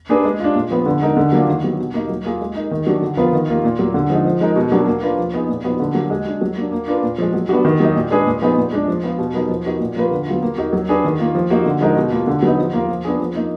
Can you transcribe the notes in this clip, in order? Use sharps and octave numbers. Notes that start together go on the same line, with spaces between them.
A#3 D4 G#4 B4
G#3
D4 F4
A#2
F3 B3
D3
G#3 D#4 A#4
D3
F#3 A#3 D4 F4
D#3
F#3 B3
B2
A#3 D#4
F#3
A#3 F4 G#4
G#3
D#4 A#4
D#3
F#3 D4 F#4
D3
F3 B3 F4 A#4
D#3
A#3 F4
A#2
F#3 A#3
D3
F3 G#3 D#4
F3
G#3 D#4 A#4
B2
F#3 D4 F#4 A#4
A#3
D4 F4 B4
F3
B3 D#4 G#4
A#2
F3 B3 D#4 F#4
D3
F#3 A#3
G#3
D4 F#4
F#3
A#3 D4
A#3
D4 F4 B4
A#2
F3 G#3
F#3
B3 D4 F#4
D#3
F#3 A#3 D#4
A#2
G#3 D4 G#4 B4
A#2
F3 B3 D#4 G#4
A#2
G#3 D4
F3
B3 F4
B2
F#3 B3 D#4 A#4
F3
B3 D#4 F#4 A#4
A#2
F3 A#3 F4 B4
D3
F#3 B3 F4
A#3
D#4 F#4 A#4
F#3
D4 G#4 B4
D#3
A#3 F4
F3
A#3 D#4 F#4
D3
F3 G#3 D#4 A#4
B2
A#3 F4
D3
F#3 B3 D#4
F3
A#3 F4 A#4
F3
B3 D4 G#4
F3
A#3 D#4